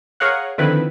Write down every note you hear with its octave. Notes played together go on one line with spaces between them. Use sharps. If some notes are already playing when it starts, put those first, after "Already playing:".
G#4 A#4 C#5 F5 F#5
D3 D#3 F3 C4 E4 B4